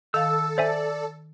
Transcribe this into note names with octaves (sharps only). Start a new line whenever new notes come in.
D#3 A4 F5 E6 A6
C5 D5 E5 G#5